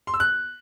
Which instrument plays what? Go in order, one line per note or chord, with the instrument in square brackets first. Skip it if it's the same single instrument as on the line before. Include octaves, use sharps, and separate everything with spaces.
[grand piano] C6
E6
F#6